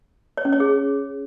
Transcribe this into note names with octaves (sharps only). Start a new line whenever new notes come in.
C#5
C#4
C#5
G#4